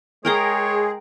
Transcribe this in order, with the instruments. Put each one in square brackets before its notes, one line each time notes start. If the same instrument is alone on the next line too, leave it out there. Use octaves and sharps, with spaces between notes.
[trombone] G#3 [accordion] G#4 [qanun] A#4 G5 A#5 [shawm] C#5